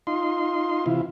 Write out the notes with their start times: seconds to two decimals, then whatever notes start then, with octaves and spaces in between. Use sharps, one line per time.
0.07 D#4 F4 C6
0.86 C3 E3 E4 F4